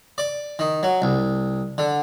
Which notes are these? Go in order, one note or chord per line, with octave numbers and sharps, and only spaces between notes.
D5
D#3
F#3
C2
D3